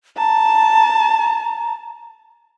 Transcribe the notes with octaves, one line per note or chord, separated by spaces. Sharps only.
A5 A#5